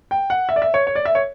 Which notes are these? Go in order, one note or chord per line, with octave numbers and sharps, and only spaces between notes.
G5
F#5
E5
D5
E5
C#5
C#5
D5
E5
C#5